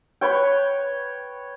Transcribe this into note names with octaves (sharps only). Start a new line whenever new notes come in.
B4 C#5 G5